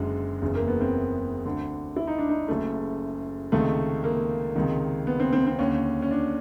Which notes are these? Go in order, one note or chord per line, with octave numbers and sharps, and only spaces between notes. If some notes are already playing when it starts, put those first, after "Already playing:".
Already playing: F#1 F#2 D3 G#3
F#1 E2 C#3
A#3
B3
C4
D2 D3
E4
D#4
D4
D#4
F#1 F#2 C#3 A3
C#2 C3 D#3 A3
A#3
C#2 C3 D#3
B3
C4
C4
C4
D#2 D3 C#4
C#4
D4